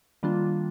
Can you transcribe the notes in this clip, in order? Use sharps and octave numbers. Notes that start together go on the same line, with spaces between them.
D#3 G3 A#3 D4 F4